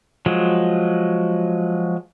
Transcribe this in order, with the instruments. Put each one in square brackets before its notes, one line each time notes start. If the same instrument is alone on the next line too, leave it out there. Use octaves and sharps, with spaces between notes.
[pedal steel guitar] F3 F#3 G#3